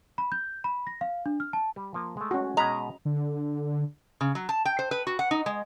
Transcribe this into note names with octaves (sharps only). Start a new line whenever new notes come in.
B5
G6
B5
A#6
F5
D4
F6
A5
G3
F3 A#3
G#3 A3
C#4 F#4
B2 G#3 D#5 A#5 B5
D3
C#3
F#3
A5
G5
C5
B4
F#4
F#5
D#4
G#3